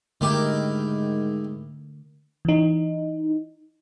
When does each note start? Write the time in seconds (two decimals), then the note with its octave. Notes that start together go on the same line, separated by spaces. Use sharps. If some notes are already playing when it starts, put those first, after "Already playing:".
0.21 G#2 D3 D#3 A3 E4 G4 A#4
2.45 E3 D#4